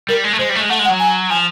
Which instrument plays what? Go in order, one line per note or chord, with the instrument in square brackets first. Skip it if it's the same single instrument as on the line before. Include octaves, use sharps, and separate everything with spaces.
[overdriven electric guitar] G3 [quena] A#4
[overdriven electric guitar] G#3
A3
[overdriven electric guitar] G#3 [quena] C5
[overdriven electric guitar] G3
A3
G#3
[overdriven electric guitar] A3 [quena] F#5
[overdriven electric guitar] G#3
[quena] F#5
[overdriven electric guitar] F#3
[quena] G#5
[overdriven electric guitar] F3 [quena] G#5